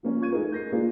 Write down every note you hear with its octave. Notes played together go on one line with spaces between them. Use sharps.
F3 A#3 C#4
F4 C#6 G#6 D#7
A3 D#4 G#4 A#4
G6 A#6 C7
A#3 D4 F4 G#4